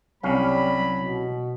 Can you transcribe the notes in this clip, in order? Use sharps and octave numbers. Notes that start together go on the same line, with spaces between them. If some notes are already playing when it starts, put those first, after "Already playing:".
C2 F#3 G3 C#4 F5 B5
B2